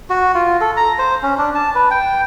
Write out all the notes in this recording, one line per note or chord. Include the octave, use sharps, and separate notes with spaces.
F#4
F4
A4
A#5
C5
C#4
D4
A5
B4
G5